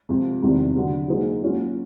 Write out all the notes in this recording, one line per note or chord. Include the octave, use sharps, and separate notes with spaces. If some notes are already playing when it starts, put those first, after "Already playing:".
F2 C3 F3
E2 C3 D#3 G3
D3 F#3 B3
F#3 A#3 D#4 G#4 C5
F#3 A#3 C#4 F4